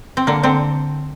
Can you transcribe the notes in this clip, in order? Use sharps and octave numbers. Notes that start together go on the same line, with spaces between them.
C4
D3 A#3
D3 C4